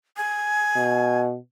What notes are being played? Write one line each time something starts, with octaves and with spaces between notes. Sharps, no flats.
G#5
B2